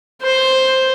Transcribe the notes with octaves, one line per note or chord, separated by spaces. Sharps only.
C5